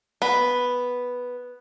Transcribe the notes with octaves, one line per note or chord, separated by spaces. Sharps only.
B3 B5